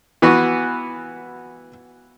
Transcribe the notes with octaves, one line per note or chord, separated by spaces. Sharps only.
E3 B3 F#4